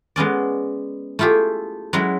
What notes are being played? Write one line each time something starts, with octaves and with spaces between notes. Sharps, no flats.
G#3 B3 C#4 D5
A3 E4 F4 G4 G#4
F#3 G#3 C#4 E4